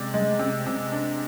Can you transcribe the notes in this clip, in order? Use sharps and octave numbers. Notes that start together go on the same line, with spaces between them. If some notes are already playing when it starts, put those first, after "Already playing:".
Already playing: C3 G#3 D5
G#3
C3
C3
D4